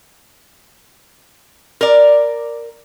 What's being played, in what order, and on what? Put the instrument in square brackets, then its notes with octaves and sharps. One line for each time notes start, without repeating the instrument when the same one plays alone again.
[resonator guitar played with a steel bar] A#4 D5